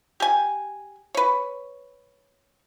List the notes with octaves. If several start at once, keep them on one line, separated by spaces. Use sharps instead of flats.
G4 G#5
B4 C#5